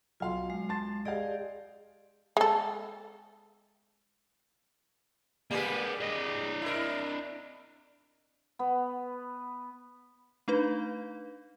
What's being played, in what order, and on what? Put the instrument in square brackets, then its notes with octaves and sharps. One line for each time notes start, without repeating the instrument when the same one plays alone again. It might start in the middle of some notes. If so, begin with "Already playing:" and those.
[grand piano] B1 F5 [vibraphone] F4 C6
[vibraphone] G#3
[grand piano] A5 C6 A6
[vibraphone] G4 G#4 D5 [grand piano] D#5 F5
[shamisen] G#3 A4
[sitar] G3 G#3 G#4 [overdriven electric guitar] A#3 B4
[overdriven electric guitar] D4 D#5
[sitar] E4 A#4
[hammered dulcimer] B3
[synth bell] A3 D4 D#4 B4